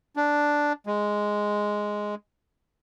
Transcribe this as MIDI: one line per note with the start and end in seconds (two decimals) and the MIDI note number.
0.17 0.73 62
0.87 2.15 56